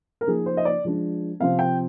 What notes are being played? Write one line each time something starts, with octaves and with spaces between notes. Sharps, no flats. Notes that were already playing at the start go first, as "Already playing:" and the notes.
A#4
F3 A#3 D#4 G#4
C5
D#5
D5
F3 G#3 D4
C3 F3 C4 F5
G5